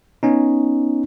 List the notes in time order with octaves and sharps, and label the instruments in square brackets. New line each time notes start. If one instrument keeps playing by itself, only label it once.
[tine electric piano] B3 C#4 D#4